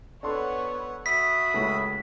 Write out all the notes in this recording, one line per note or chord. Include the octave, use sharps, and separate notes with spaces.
B3 D4 A4 C#5 F#5 C6
F#4 E5 B5 D#6 B6
C#2 A2